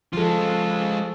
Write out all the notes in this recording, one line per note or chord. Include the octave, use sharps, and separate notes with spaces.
F3 G#3 F4 A4